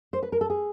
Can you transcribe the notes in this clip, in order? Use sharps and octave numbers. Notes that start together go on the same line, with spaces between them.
C5
B4
A#4
A4
G#4